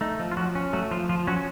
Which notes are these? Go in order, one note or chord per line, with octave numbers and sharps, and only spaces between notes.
A3 D#4
F3
F4
F3 F#3 F#4
C#4
F#3 A3 F#4
F3 F4
F3 F4
F#3 C#4 F#4